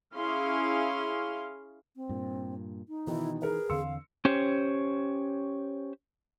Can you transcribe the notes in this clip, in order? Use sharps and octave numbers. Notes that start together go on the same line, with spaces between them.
C#4 E4 G#4 F5 C6
C4
G2 A#2
D#4
B2 D#3 E3 E4
G#4 A#4 B4
E2 D3 C4 F5 C6 E6 C#7
C#4 G4 C5 C#5